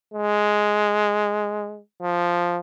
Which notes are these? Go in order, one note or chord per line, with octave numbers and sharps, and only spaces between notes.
G#3
F3